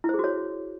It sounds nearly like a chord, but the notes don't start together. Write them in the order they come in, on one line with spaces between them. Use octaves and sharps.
E4 C5 G#4 F#4 C#5